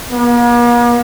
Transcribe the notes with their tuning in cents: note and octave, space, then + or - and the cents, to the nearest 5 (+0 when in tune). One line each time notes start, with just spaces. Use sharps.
A#3 +45